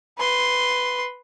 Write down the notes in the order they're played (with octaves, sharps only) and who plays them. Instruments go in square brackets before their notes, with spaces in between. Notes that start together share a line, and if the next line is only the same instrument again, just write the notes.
[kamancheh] B4 C6